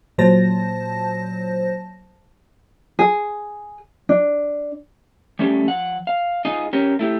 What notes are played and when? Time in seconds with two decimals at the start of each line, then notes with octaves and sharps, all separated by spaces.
0.18 A#2 F#3 C5 A5 A#6
2.99 G#4
4.09 D4
5.39 G3 A3 C#4 F#4 G4
5.66 F3 F#5
6.07 F5
6.45 D#4 F4 G#4 D#5
6.73 C#4 G4 A#4
6.99 A3 E4 G4